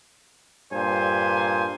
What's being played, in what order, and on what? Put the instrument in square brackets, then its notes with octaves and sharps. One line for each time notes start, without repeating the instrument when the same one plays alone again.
[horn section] G2 A#2 C5 G#5